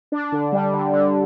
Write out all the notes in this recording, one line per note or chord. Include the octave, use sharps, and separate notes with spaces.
D4
D3
G3
D3
D3